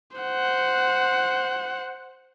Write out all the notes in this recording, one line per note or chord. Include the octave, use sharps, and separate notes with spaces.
C5 F#5